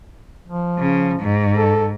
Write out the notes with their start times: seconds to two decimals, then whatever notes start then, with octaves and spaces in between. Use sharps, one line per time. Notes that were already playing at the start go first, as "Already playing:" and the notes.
0.47 F3
0.78 C#3
1.20 G#2
1.57 A4